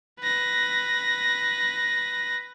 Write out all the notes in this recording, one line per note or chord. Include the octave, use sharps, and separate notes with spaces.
B4 A#6